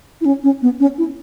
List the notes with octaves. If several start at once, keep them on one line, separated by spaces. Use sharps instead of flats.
E4
C#4
C#4
B3
C#4
E4